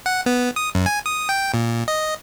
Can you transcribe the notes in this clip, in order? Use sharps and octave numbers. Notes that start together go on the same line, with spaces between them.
F#5
B3
D#6
F#2
G#5
D#6
G5
A#2
D#5